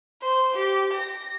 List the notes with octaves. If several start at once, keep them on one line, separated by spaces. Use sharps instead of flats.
C5
G4
A#6